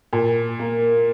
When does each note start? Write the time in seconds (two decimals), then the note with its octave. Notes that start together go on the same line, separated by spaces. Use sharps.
0.13 A#2
0.59 A#3